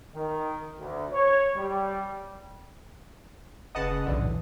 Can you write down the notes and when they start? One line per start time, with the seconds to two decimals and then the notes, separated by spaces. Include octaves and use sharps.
0.15 D#3
0.79 D2
1.12 C#5
1.56 G3
3.75 F1 C#3 B4 D#5 F#5 A5 D#6
4.06 B1 E2 D3 E3
4.17 A2